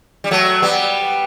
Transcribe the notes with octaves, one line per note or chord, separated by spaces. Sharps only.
G3
F#3 A3
G3 B3